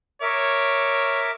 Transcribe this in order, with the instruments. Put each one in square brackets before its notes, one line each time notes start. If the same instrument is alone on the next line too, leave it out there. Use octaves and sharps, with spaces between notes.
[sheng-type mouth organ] A#4 E5 D6 [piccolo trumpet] C#5